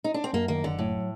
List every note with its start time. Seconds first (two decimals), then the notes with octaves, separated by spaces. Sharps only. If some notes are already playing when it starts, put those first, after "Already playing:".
0.04 D#4
0.14 D4
0.24 C4
0.33 F#2 A#3
0.48 D#3 A#3
0.64 F#1 D3
0.79 A2 F#3